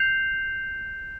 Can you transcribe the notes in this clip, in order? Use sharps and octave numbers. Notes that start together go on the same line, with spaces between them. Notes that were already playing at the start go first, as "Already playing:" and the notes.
Already playing: G6 C7 F7